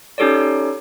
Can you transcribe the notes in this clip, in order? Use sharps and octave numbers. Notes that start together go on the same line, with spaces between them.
C#4 D#4 G4 A4 C#5 D5